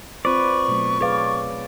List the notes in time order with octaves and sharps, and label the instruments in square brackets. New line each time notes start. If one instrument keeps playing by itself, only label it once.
[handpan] C4 F4 C5 [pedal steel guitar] B4 D5 [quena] C#6
[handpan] B2 F#3 A3
[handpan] G#4 B4 F5 [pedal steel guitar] C#5 D5